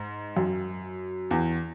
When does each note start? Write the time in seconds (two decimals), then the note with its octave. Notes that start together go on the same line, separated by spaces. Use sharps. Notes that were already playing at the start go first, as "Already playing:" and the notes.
Already playing: G#2
0.37 F#2
1.31 E2